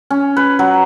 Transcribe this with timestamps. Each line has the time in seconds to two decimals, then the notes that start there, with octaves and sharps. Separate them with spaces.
0.10 C#4
0.37 B4
0.59 F#3